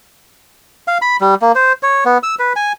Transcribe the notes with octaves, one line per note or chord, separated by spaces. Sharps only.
F5
B5
G3
A#3
C5
C#5
B3
E6
B4
G#5